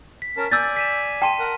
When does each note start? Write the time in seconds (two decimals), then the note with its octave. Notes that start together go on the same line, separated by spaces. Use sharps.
0.22 B6
0.37 C#4 A#4 A5
0.51 D5 G#5 E6 G6 A6
0.77 B6 D#7 E7
1.22 G5 A5 C6 D#7
1.39 A#4 F#5